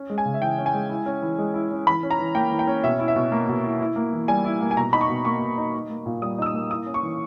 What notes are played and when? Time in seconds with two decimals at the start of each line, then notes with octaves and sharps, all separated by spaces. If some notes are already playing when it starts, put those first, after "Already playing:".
Already playing: C#4
0.10 G#3
0.18 G#5
0.25 C#3
0.34 E5
0.41 E3 G5
0.58 C#4
0.66 G#5
0.74 G#3
0.90 E4
1.06 C#4
1.22 E3
1.38 G#3
1.54 E4
1.71 C#4
1.86 E3 B5
2.03 C#4
2.11 A#5
2.19 E3
2.35 A#3 G5
2.52 E3
2.59 G5
2.67 C#4
2.84 B2 E5
2.99 E4
3.08 E5
3.16 B2
3.32 A#3
3.49 B2
3.64 E4
3.80 E4
3.96 A#3
4.13 E3
4.28 G3 G#5
4.45 E4
4.61 A#3
4.71 G#5
4.77 B2 A#5
4.93 D#4 B5
5.01 C#6
5.09 B2
5.25 A#3 C#6
5.41 B2
5.58 D#4
5.73 D#4
5.90 A#3
6.06 A#2
6.22 G3 D#6
6.38 D#4 E6
6.46 D#6
6.54 A#3
6.70 E4 D#6
6.86 C#4
6.94 C#6
7.03 E3